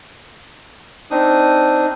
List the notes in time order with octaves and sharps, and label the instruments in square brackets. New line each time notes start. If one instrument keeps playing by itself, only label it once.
[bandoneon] C4 D4 D#4 D#6